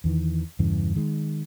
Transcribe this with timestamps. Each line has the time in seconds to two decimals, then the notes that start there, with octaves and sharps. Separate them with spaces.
0.04 E2 D#3 E3
0.59 E2 G2 C#3 E3
0.96 D#3 G#3